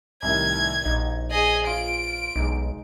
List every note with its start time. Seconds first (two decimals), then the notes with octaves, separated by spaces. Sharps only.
0.22 C2 A2 D#3 G#6
0.85 A#1 D#4
1.31 G#4 D#5
1.67 F4 D7
2.36 B1 G#3 D#4